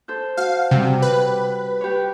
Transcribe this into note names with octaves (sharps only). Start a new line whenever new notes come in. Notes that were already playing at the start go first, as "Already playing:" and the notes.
A4 C5 G6
F#4 F5
C3 G3 G4
B4
G4 C#5